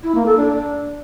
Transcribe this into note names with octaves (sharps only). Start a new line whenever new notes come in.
E4
A#3
A4
D4